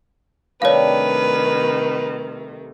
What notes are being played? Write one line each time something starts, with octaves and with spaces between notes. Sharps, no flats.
C3 D#3 G3 A3 D4 B4 C#5 F5